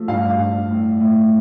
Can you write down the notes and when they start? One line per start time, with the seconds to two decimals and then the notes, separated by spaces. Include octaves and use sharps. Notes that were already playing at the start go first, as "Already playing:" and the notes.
Already playing: F3 A3
0.08 G2 F5
0.38 G2
0.69 A2
1.00 A2